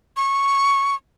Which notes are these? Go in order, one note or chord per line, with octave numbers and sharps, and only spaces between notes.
C#6